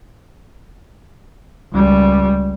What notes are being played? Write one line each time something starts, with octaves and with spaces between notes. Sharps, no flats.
C#2 G3